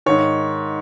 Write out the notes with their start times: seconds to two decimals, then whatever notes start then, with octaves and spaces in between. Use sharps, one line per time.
0.06 G#2 D#3 C#5